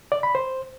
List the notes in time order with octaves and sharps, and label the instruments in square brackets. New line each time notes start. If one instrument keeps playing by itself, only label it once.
[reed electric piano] D5
B5
C5